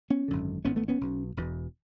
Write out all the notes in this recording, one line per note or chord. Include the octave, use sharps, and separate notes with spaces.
B3 C#4
G#1 F#2 D3
G#1 G#2 B3 C#4
A3 B3
B3 C#4
B1 B2
E1 E2 B2